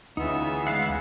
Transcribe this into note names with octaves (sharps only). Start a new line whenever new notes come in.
D2 C#3 E3 B3 D#4 F4 E5
G#3 F5 F#5